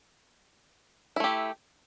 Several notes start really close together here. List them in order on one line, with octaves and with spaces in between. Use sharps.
E4 A3 G4